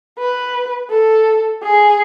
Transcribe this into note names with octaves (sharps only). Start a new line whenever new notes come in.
B4
A4
G#4